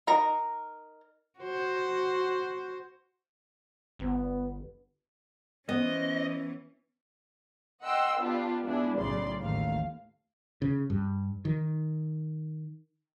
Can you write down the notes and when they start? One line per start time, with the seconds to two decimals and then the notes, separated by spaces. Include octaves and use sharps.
0.07 D#4 A#4 A#5
1.40 F#4 C5
3.99 G1 B3
5.69 E3 B3 C#4 C5 D#5
7.82 D#5 F#5 G5 C6 E6
8.19 B3 D4 F4 G4
8.64 G#3 B3 D4 E4 G#4
8.98 B1 A2 C#3 D5 C6
9.40 A1 D#2 A3 F5
10.62 C#3
10.90 G2
11.45 D#3